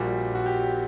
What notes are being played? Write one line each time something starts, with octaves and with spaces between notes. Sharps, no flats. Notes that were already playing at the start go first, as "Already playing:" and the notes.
Already playing: A#1 A#2 G3 F#4
F#4
G4